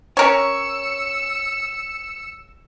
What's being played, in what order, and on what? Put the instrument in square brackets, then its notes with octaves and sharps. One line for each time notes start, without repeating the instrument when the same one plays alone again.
[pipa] C#4 A#4 C#5 [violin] E6 C#7